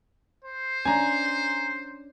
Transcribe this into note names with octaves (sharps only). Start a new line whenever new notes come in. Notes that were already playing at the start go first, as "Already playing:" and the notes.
C5
C#4 D4 G#5 A#5